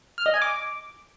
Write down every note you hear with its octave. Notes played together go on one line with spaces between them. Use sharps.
F6
D#5
G#5
D6